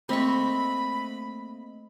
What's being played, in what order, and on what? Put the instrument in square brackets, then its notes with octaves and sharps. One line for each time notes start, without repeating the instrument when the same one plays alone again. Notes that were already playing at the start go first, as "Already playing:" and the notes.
[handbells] A3 A#3 D#5 [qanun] C4 C#6 [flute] B5